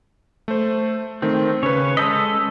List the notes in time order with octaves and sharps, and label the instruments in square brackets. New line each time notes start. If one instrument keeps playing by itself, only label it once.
[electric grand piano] A3 C5
[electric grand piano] D#3 A3 [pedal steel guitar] C4
[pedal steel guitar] C#3 C#5 [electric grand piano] C#4 B4
[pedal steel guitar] G#3 A4 D#5 [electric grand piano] D#6 G6 B6